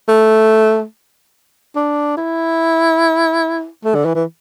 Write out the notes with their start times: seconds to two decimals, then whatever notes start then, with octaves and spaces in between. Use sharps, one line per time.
0.08 A3
1.75 D4
2.17 E4
3.84 A3
3.95 D3
4.05 E3
4.15 E3